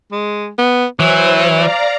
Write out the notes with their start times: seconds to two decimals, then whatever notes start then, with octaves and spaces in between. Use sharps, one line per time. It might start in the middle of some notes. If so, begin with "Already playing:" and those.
0.12 G#3
0.58 B3
1.00 E3 F#3 C5
1.52 D5 F5 A#5